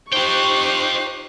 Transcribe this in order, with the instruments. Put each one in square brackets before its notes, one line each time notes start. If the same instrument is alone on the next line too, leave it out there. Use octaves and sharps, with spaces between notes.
[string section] D#4 G4 F#6 [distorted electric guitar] F4 G5 [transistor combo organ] C5 [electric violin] C#6